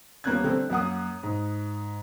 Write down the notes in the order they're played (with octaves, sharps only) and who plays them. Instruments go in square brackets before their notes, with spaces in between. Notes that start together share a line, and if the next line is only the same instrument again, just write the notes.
[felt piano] D#1 A#3 B3 C#4 F#6 G#6
D3 A3 C4
F#2 A#3 F#5 D#6
G#2